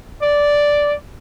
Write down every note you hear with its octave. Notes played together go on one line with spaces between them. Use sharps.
D5